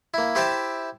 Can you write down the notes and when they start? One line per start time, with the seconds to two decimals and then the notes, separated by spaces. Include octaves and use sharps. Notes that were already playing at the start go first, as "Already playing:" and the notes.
0.14 A#3 E4
0.35 E4 G4 C5 E5 G5 A5